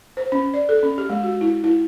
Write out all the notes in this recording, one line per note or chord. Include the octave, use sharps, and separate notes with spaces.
C5
C#4
D5
A4
C#4
G4
G#3
F#4
E4
E4